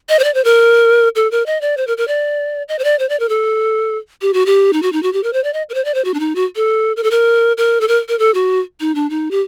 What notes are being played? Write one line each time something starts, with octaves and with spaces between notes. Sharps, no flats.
D#5
C5
D5
C5
A#4
A4
A#4
D#5
D5
C5
A#4
A#4
D5
D#5
C5
D5
C5
D5
A#4
A4
G4
F#4
G4
D#4
F#4
D#4
F#4
G4
A#4
C5
D5
D#5
A#4
C5
D5
C5
F#4
D4
D#4
F#4
A4
A#4
A4
A#4
A#4
A4
A#4
A#4
A4
F#4
D#4
D4
D#4
G4